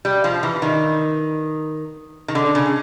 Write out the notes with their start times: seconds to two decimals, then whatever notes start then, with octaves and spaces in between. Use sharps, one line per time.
0.05 G3
0.24 F3
0.43 E3
0.62 D#3
2.28 D#3
2.35 D3
2.55 C#3